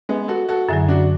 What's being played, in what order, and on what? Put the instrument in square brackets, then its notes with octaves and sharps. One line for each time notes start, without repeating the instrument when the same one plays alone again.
[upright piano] G#3 B3
F#4 A4
F#4 A4
[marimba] F#2 D3 F#3 [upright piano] E4 G#4
[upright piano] D4 F#4